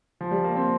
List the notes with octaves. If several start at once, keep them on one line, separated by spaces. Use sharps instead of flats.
F3
G3
A#3
C4